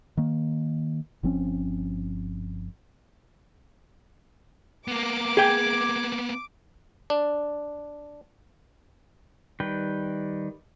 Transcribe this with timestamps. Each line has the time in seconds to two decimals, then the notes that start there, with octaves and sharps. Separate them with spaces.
0.17 D#3 A#3
1.23 G1 F3 C4 C#4
4.88 A#3 B3 D6
5.37 G#4 G5 G#6
7.10 D4
9.60 D#3 G3 B4 G5